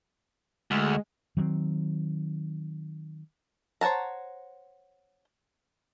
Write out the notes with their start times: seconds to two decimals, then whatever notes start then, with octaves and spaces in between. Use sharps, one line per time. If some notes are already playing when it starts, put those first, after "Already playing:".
0.71 D2 G#3
1.37 D#3 F#3 G3 C4
3.81 C5 C#5 F#5 A5 A#5